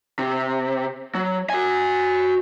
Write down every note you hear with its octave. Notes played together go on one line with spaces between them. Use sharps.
C3
F#3
F#4 G#5